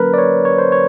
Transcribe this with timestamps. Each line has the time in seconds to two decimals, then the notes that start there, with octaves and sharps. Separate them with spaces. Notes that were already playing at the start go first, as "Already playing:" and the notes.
Already playing: D3 F#3 A#3 C#4 A#4 B4
0.14 D5
0.18 C#5
0.45 C#5
0.58 C5
0.72 C#5